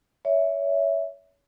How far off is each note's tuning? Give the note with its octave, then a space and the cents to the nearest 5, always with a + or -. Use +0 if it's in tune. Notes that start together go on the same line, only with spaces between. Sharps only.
C#5 +25 E5 +0